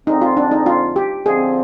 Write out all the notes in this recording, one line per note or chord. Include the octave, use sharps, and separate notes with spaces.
F2 D3 F3 G#3 C4 D#4
F4
D4
D#4
F4
G4
D3 F3 C4 G#4